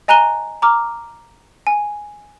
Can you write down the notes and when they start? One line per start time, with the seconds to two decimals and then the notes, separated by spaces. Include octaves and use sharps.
0.08 D#5 G#5 A#5 F#6 D#7 G7
0.62 A#5 D6 F6
1.67 G#5